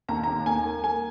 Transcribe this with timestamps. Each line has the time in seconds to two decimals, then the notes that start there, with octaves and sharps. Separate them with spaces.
0.09 D#2 A#5
0.23 D#2 A#5
0.46 D#2 G#5
0.65 A#3
0.84 A#3 G#5